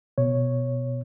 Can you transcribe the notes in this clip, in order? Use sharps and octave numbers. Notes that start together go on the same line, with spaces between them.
B2 C#5